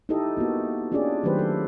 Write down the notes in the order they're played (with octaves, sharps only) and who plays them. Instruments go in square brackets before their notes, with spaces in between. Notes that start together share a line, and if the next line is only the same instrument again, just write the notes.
[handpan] D#4 E4 G4 A4 D#5
A#3 B3 F#4
C#4 D4 F4 G4 G#4 D5
D#3 F#3 A3 G4 B4 C5
A4